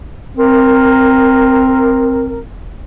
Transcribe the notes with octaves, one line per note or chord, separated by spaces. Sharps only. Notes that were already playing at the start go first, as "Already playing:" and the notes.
C4 A#4